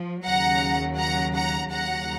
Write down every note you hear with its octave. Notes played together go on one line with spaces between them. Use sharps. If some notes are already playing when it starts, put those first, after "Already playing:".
Already playing: F3
D#2 C#3 F#3 F#5 A#5
F#5 A#5
F#5 A#5
D#2 C#3 F#3 F#5 A#5